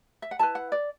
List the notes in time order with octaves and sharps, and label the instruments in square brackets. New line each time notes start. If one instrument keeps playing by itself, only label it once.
[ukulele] E5
F#5
E4 B4 A5
F#5
D5